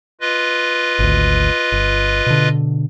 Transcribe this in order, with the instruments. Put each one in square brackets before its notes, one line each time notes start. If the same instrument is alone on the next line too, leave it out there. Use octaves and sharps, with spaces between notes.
[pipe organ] F4 B4 D#5
[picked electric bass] G#1 D2
G1
B2 D3